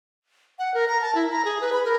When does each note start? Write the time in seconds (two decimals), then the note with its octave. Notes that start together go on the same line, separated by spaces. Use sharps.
0.59 F#5
0.74 A#4
0.88 A#5
1.01 A5
1.15 E4
1.32 A#5
1.45 G#4
1.61 B4
1.73 B5
1.85 A#4